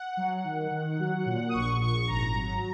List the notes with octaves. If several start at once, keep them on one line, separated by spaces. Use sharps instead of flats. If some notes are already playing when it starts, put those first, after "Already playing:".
Already playing: F#5
F#3
D#3
D#3
F#3
A#2
D#6
A#1 C#6
A#1 C#6
G#1 A#5
F#3